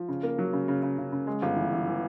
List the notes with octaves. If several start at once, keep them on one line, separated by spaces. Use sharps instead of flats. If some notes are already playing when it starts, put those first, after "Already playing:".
Already playing: F3
C#3
A#3
F#3
C#3
C#3
C#3
C#3
C#3
G#3
G1
E3
E3
E3